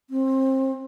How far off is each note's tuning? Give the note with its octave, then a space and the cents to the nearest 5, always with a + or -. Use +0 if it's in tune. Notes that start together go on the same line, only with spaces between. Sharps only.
C4 +25